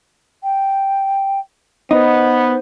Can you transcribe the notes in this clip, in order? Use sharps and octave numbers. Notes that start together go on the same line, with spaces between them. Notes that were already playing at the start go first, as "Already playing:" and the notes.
G5
B3 D#4 C5